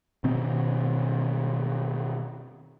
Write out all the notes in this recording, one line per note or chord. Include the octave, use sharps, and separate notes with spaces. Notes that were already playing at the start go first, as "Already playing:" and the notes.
B2 D#3 C4